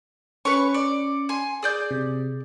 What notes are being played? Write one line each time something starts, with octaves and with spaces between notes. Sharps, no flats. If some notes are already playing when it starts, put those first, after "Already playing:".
C#4 B4 C#5 C#6 C#7
D5
G#5 C6
G#4 D5 G6
C3